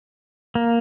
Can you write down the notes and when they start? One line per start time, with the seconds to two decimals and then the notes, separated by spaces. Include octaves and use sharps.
0.55 A#3